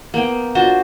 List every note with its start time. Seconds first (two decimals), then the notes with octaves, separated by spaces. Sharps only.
0.14 A#3 B3 G5
0.55 D4 F4 F#4 C5